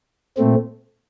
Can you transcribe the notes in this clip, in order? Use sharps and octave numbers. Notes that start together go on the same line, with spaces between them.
A#2 A3 C4